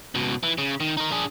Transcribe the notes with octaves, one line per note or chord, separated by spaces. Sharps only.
C#2 B2
E3
C#3
D#3
D#4 A#4
D4 G#4